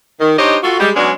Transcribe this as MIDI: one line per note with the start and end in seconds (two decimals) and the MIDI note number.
0.20 0.34 51
0.38 0.58 62
0.38 0.58 63
0.38 0.58 67
0.38 0.58 72
0.38 0.58 73
0.38 0.58 75
0.63 0.78 65
0.63 0.78 66
0.63 0.78 69
0.80 0.90 55
0.80 0.90 56
0.96 1.12 54
0.96 1.12 56
0.96 1.12 59
0.96 1.12 61
0.96 1.12 62